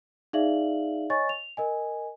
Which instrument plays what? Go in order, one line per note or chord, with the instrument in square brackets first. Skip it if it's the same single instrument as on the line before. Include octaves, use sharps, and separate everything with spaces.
[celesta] D#4 G#4 D5 E5 F5 F#7
C#5 D#5 G#5 C#6 A6
F7
A#4 D#5 G#5